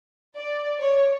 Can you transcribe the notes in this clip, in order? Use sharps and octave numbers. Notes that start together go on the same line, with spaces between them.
D5
C#5